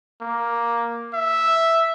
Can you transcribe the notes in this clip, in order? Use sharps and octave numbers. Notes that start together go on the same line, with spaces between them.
A#3
E5